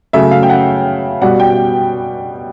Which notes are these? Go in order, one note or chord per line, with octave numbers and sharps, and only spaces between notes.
C#3 F#3 A3 E5
F5
G5
F#5
B2 G3 F#5
G5